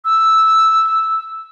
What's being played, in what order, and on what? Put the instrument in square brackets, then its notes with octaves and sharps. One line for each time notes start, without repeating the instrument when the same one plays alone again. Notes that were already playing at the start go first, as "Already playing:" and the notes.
[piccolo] E6